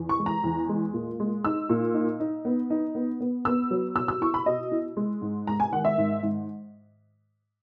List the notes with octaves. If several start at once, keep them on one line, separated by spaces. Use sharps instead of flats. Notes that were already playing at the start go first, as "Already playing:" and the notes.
Already playing: E2
C#6
G#3
A#5
E2
G#3
A#2
G#3
D#4 E6
A#2
D#4
D#4
B3
D#4
B3
B3
B3 E6
F#3
B2 E6
E6
E4 C#6
B5
B2 D#5
E4
G#3
G#2
G#2 A#5
G#5
D#3 F#5
E5
G#2
G#2